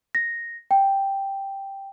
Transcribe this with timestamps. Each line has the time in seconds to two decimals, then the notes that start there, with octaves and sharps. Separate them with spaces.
0.15 A#6
0.71 G5